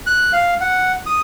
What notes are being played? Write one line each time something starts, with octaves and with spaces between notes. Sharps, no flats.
F#6
F5
F#5
D#6